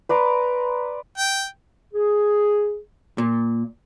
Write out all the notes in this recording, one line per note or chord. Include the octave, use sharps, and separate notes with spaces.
B4 D5 A#5 C6
G5
G#4
A#2